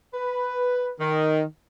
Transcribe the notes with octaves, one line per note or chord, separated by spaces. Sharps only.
B4
D#3